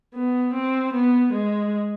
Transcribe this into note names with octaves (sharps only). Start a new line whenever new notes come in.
B3
C4
B3
G#3